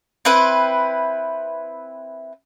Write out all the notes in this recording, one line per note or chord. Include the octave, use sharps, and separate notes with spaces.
C4 E4 B4